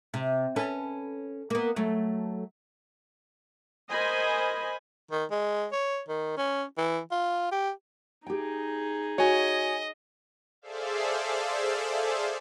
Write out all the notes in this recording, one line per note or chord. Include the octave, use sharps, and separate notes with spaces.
C3
C#4 A4 B4
A#3 B3
F#3 A3
A#4 C5 D#5 G#5 B5
D#3
G#3
C#5
D#3
C#4
E3
F4
G4
D#4 G4 G#4 G5
F#4 C#5 D#5 G#5
G#4 A4 C5 D5 E5 F5